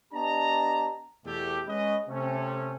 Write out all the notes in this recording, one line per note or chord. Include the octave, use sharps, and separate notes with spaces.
B3 D4 G4 D#5 A5 A#5
E2 B2 A3 G4
G#3 C#4 B4 D#5
C3 A3 C#4